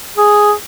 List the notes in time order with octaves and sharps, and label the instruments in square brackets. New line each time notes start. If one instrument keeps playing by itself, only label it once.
[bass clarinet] G#4